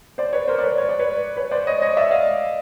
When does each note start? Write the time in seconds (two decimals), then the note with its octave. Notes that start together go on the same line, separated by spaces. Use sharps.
0.18 C5 D5
0.33 B4 C#5
0.48 A#4 C5
0.59 D5
0.64 B4 C#5
0.78 C#5
0.89 D5
0.99 B4 C#5
1.37 B4 C#5
1.51 C5 D5
1.67 C#5 D#5
1.82 C#5 D#5
1.97 D5 E5
2.11 D#5 F5